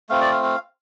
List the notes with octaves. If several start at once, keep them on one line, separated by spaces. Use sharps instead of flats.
A3 C4 F4 F5
D5
F5
F5